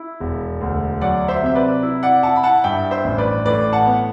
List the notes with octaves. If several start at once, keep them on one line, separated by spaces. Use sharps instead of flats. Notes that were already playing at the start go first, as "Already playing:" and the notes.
Already playing: E4
E1
D2
F#3 D5 F#5
C5 E5
C3 E5
B4 D5
E4
D5 F#5
E4 F#5 A5
B5
F#5 A5
G2 E5 G5
C5 E5
A1
B4 D5
A2 B4 D5
F#5 A5
B3